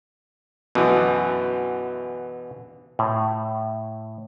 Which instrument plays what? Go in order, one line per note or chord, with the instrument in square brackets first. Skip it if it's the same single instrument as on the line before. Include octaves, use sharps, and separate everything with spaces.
[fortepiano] F#2 D3 E3 [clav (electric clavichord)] B2
[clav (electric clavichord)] A2